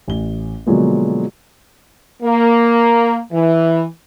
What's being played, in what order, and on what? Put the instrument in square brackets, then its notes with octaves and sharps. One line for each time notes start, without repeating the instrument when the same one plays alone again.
[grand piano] A1 G7
B2 D3 F3 F#3 G#3 A#3
[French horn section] A#3
E3